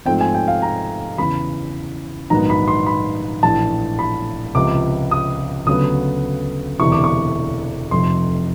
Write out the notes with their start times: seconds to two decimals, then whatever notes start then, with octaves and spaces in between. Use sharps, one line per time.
0.06 G#2 F3 A3 C4 G5
0.21 G#5
0.35 G5
0.48 F5
0.62 A#5
1.18 E2 C#3 E3 B5
2.30 A#1 G#2 D#3 F#3 B3 A#5
2.50 B5
2.68 C6
2.87 B5
3.43 A#1 A2 E3 A5
3.99 B5
4.55 C#2 C3 F3 D6
5.11 D#6
5.67 D2 C#3 F#3 B3 D#6
6.79 E1 D2 C3 E3 C#6
6.92 D6
7.04 C#6
7.91 F1 F2 C3 C6